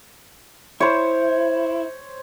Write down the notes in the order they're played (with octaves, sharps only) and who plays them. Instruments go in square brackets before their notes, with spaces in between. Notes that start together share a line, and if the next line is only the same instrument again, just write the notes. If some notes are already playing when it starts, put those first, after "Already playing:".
[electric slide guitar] E4 [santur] C5 C#5